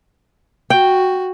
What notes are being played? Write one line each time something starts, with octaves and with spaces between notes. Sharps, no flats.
F#4 G5